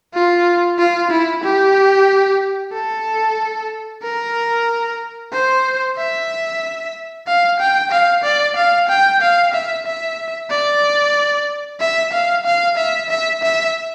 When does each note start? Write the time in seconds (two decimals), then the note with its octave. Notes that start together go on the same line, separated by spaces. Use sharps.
0.14 F4
0.79 F4
1.10 E4
1.43 G4
2.73 A4
4.02 A#4
5.32 C5
5.97 E5
7.27 F5
7.59 G5
7.91 F5
8.23 D5
8.56 F5
8.89 G5
9.22 F5
9.53 E5
9.86 E5
10.50 D5
11.81 E5
12.12 F5
12.45 F5
12.77 E5
13.10 E5
13.43 E5